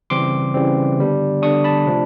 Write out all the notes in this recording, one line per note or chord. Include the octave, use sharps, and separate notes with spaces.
C#3 E3 G3 C4 C6 D6
C#3 E3 G3 C4
D3 G3 B3 D4
D3 G3 B3 D4 C#6 D#6
A5 B5
C3 F3 A3 D4